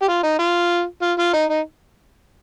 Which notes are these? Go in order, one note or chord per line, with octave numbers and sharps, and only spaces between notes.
G4
F4
D#4
F4
F4
F4
D#4
D#4